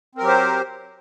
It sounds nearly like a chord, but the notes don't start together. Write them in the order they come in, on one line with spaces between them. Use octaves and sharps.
C4 A#4 F#3 G4 C5